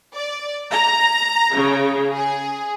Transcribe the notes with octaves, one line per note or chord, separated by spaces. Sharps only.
D5
A#5
C#3
G#4